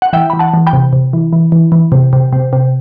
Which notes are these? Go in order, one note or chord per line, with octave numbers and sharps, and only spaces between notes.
F#5
E3 E5 G5
E3 B5
F#5 A5
E3
G5 B5
C3
C3
E3
E3
E3
E3
C3
C3
C3
C3